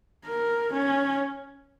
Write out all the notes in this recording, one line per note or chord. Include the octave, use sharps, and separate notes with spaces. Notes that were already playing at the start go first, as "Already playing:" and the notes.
A#4
C#4